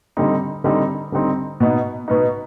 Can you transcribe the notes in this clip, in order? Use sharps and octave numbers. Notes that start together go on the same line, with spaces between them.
D3 G3 C4 D#4
D3 G3 C4 D#4
D3 G3 C4 D#4
B2 B3 D#4
B2 B3 D#4